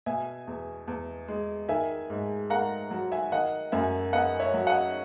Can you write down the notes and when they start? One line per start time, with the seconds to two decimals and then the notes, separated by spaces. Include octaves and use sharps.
0.06 B2 E5 G#5
0.47 E2
0.88 E2
1.28 G#3
1.69 D#3 E5 G#5
2.10 G#2
2.50 A#3 F#5 A#5
2.91 F#3
3.12 E5 G#5
3.32 D#3 D#5 F#5
3.72 F#2 E5 G#5
4.13 B3 D#5 F#5
4.39 C#5 E5
4.54 F#3
4.67 D#5 F#5